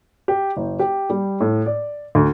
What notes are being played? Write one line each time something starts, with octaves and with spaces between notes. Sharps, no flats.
G4
F#1
G4
G3
A2
D5
D2